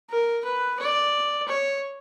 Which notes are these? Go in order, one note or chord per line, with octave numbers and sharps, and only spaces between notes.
A#4
B4
D5
C#5